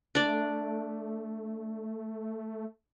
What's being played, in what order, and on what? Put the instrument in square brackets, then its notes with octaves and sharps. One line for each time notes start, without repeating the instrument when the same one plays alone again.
[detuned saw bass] A3 [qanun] D4 D5